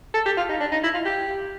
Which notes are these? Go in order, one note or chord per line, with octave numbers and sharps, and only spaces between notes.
A4
G4
F4
D#4
D4
D#4
E4
F4
G4